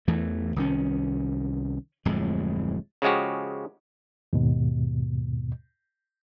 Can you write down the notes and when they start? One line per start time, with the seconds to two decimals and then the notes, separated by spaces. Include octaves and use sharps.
0.07 E2 E3 A3
0.56 C2 D#3 C#4
2.05 D1 F2 A2 G#3
3.02 C#3 F3 G#3 F#4 G4
4.33 D#2 G#2 B2